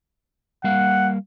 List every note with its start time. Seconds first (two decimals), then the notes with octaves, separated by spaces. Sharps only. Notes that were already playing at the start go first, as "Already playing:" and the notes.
0.64 G3 A#3 F5 F#5